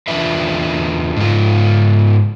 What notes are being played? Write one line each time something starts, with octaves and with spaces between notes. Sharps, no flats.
E2 D4 F4 B4 E5
G#2 F4